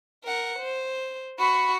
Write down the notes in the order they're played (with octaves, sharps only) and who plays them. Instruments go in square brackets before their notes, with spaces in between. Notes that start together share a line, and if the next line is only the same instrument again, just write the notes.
[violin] A#4 F#5
C5
[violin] F#4 C#6 [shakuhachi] B5